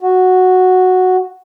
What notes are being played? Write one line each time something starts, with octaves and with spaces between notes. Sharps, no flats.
F#4